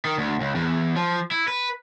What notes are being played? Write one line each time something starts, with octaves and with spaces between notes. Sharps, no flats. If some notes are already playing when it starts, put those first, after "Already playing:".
D#3
D2
C#2
E2
F3
E4
B4